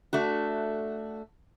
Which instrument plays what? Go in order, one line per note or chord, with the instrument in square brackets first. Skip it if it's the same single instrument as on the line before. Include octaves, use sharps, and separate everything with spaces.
[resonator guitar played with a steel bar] A3 D4 F#4